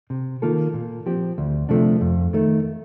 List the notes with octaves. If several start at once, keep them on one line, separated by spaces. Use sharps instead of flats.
C3
D#3 A#3 F4 A4
A#2
F3 C4 G4
D2
C3 F3 A3 D4
F2
D#3 A3